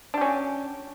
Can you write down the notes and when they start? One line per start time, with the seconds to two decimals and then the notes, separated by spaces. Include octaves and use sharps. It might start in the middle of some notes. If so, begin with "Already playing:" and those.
0.14 D4
0.18 G4
0.21 C#4
0.25 F#3